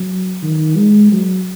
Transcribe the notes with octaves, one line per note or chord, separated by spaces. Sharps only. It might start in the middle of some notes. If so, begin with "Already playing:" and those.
Already playing: F#3
D#3
G#3
F#3